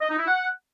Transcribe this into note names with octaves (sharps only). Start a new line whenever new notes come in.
D#5
D#4
E4
F#5